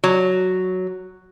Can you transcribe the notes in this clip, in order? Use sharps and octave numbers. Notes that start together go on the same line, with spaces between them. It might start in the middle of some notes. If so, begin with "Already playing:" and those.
F#3